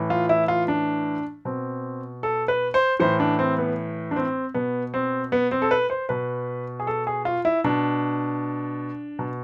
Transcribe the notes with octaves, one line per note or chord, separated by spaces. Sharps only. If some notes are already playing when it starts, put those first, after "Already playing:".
Already playing: A2 E3
F4
E4
F4
D4
B2 C4
A4
B4
C5
A2 E3 C5
D4
C4
B3
D4
C4
B2 B3
C4
B3
C4
A4
B4
C5
B2 B4
G#4
A4
G#4
F4
E4
B2 D4
B2